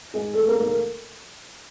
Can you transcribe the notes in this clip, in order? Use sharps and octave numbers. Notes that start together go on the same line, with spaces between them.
G#3 G#4
A3 A4
A#3 A#4
A#3 A#4